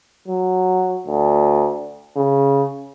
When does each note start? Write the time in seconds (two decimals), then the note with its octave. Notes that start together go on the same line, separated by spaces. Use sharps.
0.28 F#3
1.06 D2
2.17 C#3